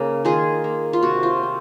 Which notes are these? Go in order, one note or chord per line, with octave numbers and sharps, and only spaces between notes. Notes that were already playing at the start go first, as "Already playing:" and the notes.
Already playing: C#3 A#3 D#4
D#3 F4 G#4
A#3
F4
C3 F#4
F4
C4